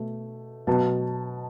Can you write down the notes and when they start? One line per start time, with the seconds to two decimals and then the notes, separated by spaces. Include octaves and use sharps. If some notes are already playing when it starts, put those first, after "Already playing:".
Already playing: B2 A3
0.67 B2 F#3 B3 A5